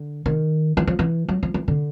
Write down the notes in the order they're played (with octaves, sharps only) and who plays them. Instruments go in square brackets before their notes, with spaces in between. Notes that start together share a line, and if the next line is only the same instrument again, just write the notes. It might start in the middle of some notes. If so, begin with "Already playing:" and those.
Already playing: [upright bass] D3
D#3
E3
F3
E3
F#3
F3
E3
D3